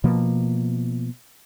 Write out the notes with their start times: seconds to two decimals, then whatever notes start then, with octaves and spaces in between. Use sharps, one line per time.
0.04 B2 F3 A#3